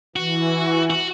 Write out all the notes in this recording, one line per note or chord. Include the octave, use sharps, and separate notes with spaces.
E3 F#4
F#4